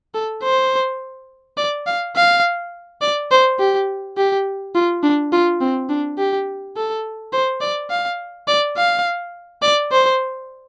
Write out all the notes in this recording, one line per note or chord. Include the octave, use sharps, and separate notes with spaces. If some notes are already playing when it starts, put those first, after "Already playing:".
A4
C5
D5
F5
F5
D5
C5
G4
G4
F4
D4
F4
C4
D4
G4
A4
C5
D5
F5
D5
F5
D5
C5